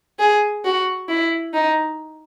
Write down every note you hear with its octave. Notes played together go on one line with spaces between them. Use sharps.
G#4
F#4
E4
D#4